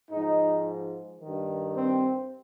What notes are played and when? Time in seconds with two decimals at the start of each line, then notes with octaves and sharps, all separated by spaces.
0.11 G#2 F3 D#4
1.21 G2 D#3
1.76 C4